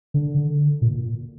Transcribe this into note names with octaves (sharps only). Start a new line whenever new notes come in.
D3
A#2